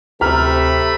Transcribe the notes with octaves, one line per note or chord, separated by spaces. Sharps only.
D2 C3 A3 A#5 B5 F6